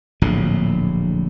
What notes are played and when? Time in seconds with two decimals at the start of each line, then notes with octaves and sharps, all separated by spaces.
0.22 D1 A#1 A2